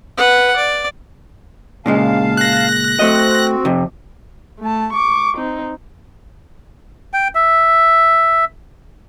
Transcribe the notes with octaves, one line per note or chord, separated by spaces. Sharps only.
B4 F#5
D5
A#2 C#3 G#3 F5 A5
F#6 A#6
A3 C4 F#4 D#5
F2 C3
A3 A5
C#6 D6
C4 D#4
G5
E5